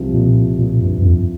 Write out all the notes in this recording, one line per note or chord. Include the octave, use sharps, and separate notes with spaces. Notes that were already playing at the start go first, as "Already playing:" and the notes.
Already playing: C2 C3 F3
A#2
A#2
G2
G2
F2